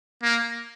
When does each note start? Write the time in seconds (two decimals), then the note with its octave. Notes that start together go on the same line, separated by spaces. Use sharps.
0.23 A#3